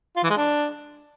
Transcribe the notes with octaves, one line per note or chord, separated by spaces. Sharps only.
F4
E3
G#3
D4